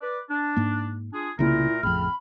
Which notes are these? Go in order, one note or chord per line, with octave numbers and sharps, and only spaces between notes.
B4 D5
D4
G#2 A#3
D4 F4 G#4
C2 A#2 C#3 A3 A#3 E4 A#4
A1 F2 C#3 C4 B5 F6